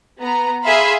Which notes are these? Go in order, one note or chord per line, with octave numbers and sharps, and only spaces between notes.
B3 A#5
G#4 E5 F5 B5 C6